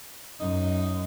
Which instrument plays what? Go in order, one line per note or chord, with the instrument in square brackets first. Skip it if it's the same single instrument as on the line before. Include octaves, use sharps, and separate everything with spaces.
[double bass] F#2 [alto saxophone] D#4